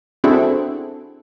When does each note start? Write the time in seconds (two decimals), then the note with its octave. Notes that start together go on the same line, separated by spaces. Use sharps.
0.24 C4 D4 E4 F#4 G#4 A4